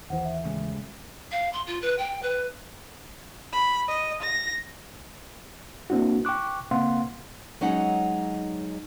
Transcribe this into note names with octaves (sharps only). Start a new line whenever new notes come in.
D#2 E3 C5 F#5
E5
A2 C#3 G#3
F5
C6
F4
B4
G5
B4
B5
D#5
A#6
A#3 C4 D4 E4 F#4
G5 C#6 D6 F#6
C#3 A#3 C4 F5 F#5 C6
F#3 G#3 C#4 D#4 F#5